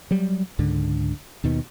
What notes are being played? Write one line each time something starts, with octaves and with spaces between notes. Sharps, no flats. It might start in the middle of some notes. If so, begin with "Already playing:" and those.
F#3 G3
C#2 G#2 D3
D#2 B2 D#3